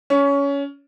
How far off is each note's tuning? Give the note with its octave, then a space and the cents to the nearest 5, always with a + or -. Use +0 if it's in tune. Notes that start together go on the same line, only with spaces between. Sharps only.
C#4 +20